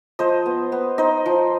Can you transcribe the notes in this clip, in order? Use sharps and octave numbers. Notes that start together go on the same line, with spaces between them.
F3 C5 D#5
B3
B3
D#4 C5 D#5
F3